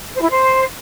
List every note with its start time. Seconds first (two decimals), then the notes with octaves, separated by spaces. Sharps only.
0.14 C5
0.22 E4
0.29 C5